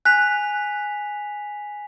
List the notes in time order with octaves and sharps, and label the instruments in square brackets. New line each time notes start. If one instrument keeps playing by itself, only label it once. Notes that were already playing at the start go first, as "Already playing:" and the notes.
[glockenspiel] G#5 B6 F7 [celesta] F#6